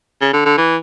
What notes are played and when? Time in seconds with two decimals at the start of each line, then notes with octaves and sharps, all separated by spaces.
0.22 C#3
0.33 D3
0.45 D3
0.58 E3